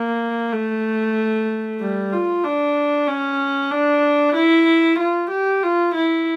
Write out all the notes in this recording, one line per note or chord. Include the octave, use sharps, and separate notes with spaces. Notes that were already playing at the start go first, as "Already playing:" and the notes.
Already playing: A#3
A3
G3
F4
D4
C#4
D4
E4
F4
G4
F4
E4